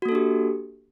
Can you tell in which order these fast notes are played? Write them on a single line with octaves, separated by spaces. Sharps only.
F#4 A#3 A4 D4 G4